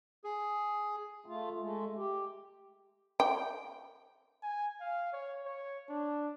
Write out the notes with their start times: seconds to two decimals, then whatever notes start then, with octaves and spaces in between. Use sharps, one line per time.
0.24 G#4
1.26 A3 F4
1.59 G#3 A3
1.96 G4
3.20 G5
4.43 G#5
4.81 F5
5.13 C#5
5.46 C#5
5.89 D4